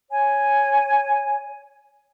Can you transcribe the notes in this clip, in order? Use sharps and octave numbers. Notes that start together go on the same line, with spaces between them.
C#5 G#5